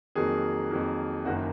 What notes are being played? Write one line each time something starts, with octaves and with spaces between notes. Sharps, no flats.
F2 D#3 F#3 A#3 G#4
F2 D#3 F#3 A#3
F#1 F#2 D#3 A#3 F#4